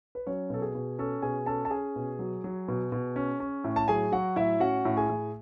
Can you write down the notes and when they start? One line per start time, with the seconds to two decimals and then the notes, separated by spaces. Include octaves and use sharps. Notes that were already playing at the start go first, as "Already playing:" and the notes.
0.15 B4
0.26 F#3 C#4 C#5
0.50 B2 A4
0.62 G#4
0.75 B2
0.99 C#4 A4
1.22 B2 G#4 G#5
1.46 C#4 A4 A5
1.65 A5
1.71 C#4 G#4 G#5
1.96 B2
2.19 F#3
2.44 F#3
2.68 B2
2.92 B2
3.16 C#4
3.40 C#4
3.64 A2
3.76 A5
3.88 F#3 G#4 G#5
4.12 F#3 F#4 F#5
4.36 A2 E4 E5
4.60 C#4 F#4 F#5
4.85 A2
4.97 G#4 G#5
5.09 A2